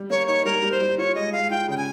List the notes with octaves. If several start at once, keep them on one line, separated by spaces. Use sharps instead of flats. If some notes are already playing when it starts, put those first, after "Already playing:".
Already playing: G3
A#3 C#5
D#4 C#5
G3 A#4
G3
C5
G3
F4 C#5
G#3 D#5
G#3 F5
F4 G5
C#3 G5
G#5